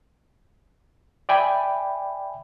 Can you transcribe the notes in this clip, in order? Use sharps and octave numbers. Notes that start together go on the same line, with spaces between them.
D5 E5 G5 G#5 B5